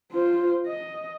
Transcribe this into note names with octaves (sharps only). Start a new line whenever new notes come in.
F4 C5
D#5